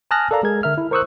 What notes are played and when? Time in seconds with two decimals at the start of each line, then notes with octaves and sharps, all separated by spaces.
0.11 G#5 A5 D#6 F6 F#6 A#6
0.31 A4 A#4 D5 F5 A#5
0.43 G#3 G#4 A#4 G#6
0.63 D3 A#4 E5 F6
0.78 E4
0.91 A#4 C5 C#6 D#6 E6 F#6